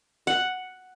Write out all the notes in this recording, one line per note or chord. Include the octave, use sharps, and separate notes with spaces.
F#5